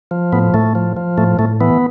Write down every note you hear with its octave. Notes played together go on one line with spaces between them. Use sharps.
F3
A2 B3
A2 A3
F3
F3
A2 A3
A2 A3
E3 B3